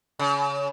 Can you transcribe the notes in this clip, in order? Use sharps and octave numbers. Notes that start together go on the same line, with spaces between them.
C#3